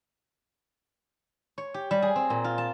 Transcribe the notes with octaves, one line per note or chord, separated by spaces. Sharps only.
C#5
G4
G3
G#4
C4
A#2
F4
A5